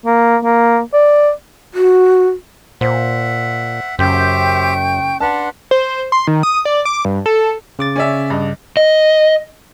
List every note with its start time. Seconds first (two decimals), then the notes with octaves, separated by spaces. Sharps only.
0.06 A#3
0.44 A#3
0.94 D5
1.74 F#4
2.81 A#2 C5 E5 F#5
3.99 F#1 F#2 G4 C5 E5 G5 C#6 G6
5.20 D4 B4 F#5 A5 C6
5.71 C5
6.12 C6
6.27 D#3
6.43 D#6
6.65 D5
6.85 D6
7.05 G2
7.26 A4
7.79 C#3 D6 A6
7.96 C#4 D5 E5
8.30 G2 D#5
8.77 D#5